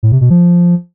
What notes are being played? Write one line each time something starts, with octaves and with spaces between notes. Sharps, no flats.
A2
C3
B2
F3